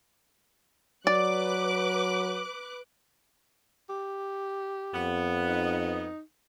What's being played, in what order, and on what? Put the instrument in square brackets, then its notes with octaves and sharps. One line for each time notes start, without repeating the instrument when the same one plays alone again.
[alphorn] F#3 [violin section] B4 D6 F#6 [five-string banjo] D5
[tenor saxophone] G4
[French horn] F2 [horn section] B3
[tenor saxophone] D#4